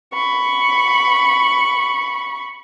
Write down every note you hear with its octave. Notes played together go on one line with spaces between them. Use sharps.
B5 C#6